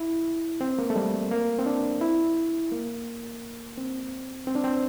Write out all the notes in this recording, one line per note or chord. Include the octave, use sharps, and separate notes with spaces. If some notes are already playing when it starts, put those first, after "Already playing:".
Already playing: E4
C4
A#3
A3
G3
A#3
C4
D4
E4
A#3
C4
C4
D4
C4